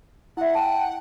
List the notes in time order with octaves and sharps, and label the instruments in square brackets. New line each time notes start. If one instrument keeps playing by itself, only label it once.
[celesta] E4 E5 [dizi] F#5
[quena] G5 [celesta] A5